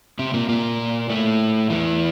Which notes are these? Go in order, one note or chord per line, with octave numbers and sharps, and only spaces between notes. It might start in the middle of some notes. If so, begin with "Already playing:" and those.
C3 C4
A#2 A#3
A#2 A#3
A2 A3
E2 E3